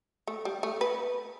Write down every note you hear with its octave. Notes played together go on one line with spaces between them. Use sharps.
A3
G3
A3
B4